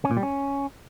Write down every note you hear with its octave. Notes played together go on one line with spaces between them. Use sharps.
C#4
A#2
G3
C#4